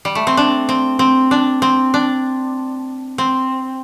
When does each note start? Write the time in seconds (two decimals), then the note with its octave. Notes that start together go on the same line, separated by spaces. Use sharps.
0.05 G3
0.15 A3
0.27 C4
0.37 D4
0.69 C4
0.99 C4
1.31 D4
1.62 C4
1.94 D4
3.18 C4